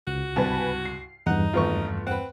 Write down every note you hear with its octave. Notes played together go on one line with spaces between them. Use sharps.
C#2 F#4
C2 G2 B4 G#5 A5
C7
E2 G2 D#4 F#5
G#1 A3 B3 F4 C#6
C4 B4 F#5